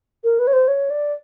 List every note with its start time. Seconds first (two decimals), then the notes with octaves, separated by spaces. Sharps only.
0.24 A#4
0.39 B4
0.47 C#5
0.53 C5
0.68 C#5
0.90 D5